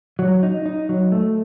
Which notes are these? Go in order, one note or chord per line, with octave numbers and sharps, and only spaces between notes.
F#3
D#4
D#4
F#3
A3